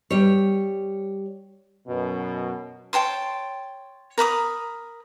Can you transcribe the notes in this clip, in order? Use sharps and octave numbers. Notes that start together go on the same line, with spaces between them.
G3 C#5
F#2 B2
C#5 G5 A5 C6
A#4 B5 D6 D#6